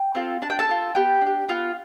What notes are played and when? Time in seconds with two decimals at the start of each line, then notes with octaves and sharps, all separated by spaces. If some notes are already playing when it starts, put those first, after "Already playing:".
Already playing: G5
0.15 C4 F4 A4
0.42 D4 A5
0.50 G5
0.59 A4 A5
0.69 F4 A4
0.95 B3 G4 G5
1.21 D4
1.26 G4
1.48 B3 F4 F5